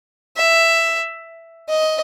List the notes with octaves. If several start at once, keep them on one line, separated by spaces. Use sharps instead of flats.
E5
D#5